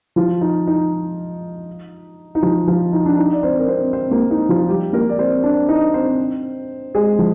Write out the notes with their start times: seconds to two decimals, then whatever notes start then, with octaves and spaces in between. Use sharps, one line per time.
0.16 F3 F4
0.41 D#4
0.67 D#4
2.35 D#4
2.42 F3 F4
2.67 F3 F4
2.93 D#4
3.06 D4
3.18 D#4
3.33 D5
3.43 C4 C5
3.59 A#4
3.68 C4 C5
3.93 C4 C5
4.11 A#3 A#4
4.31 D#4
4.49 F3 F4
4.68 G3 G4
4.93 A#3 A#4
5.09 D5
5.19 C4 C5
5.43 D4 D5
5.69 D#4 D#5
5.94 C4 C5
6.95 G#3 G#4
7.19 F3